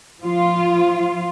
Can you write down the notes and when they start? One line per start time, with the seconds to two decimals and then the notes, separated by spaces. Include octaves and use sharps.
0.21 F3 F4